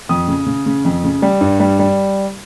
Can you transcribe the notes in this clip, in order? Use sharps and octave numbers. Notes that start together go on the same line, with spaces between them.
F2 D#6
C#3
C#3
C#3
F2
C#3
G3
G2
G3
G3